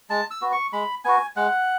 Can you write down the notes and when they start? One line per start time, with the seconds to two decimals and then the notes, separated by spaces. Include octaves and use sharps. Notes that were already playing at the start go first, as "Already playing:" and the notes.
0.10 G#3 A5
0.31 E6
0.42 B3 F#4
0.52 C#6
0.73 G#3 B5
1.04 B3 F#4 G#5
1.36 G#3 F#5